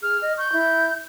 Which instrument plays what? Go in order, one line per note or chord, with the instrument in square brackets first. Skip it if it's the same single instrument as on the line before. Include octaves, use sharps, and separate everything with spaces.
[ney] G#4 [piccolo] F6
[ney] D#5
[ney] C#6 [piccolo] G6
[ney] E4